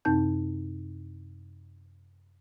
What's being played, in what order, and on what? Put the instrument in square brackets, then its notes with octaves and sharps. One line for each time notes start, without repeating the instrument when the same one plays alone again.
[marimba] F#2 C3 C4 D#4 A5 G6